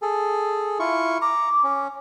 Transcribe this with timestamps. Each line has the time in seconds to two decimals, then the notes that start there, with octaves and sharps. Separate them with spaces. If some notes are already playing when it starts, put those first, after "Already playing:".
0.02 G#4 A4
0.80 E4 F4 C#6
1.22 A#5 D6
1.64 C#4